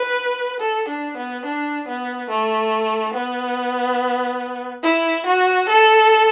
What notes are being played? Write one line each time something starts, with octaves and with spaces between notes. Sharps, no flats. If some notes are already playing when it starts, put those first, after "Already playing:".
Already playing: B4
A4
D4
B3
D4
B3
A3
B3
E4
F#4
A4